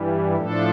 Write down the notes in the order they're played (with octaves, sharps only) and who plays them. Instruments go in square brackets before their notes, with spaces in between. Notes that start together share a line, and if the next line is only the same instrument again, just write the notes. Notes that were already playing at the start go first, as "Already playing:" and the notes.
Already playing: [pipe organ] G2 E3 G3
A2 F3 A3 D4 A4